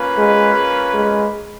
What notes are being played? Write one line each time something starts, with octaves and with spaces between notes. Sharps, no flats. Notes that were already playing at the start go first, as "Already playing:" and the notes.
Already playing: A#3 C#4 F4 B4
G#3
G#3